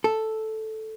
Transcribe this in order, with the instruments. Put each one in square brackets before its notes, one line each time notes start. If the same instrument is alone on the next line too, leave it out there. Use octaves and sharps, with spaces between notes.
[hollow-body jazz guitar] A4